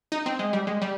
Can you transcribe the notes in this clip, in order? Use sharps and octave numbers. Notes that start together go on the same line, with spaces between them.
D#4
C4
G#3
G3
G#3
G3